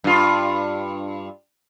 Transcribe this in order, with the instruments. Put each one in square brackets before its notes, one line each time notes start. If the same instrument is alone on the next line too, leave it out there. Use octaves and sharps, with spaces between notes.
[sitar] G2 F4